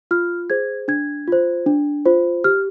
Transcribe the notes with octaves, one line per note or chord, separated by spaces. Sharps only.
F4 F6
G#4 C5 G#6
D4 G#6
F4 C5
D4
F4 C5
G4 F6